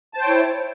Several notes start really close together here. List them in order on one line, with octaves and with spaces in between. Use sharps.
A5 C5 G5 C#5 E4